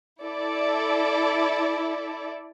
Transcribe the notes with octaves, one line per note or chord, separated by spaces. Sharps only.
E4 A4 D5 E5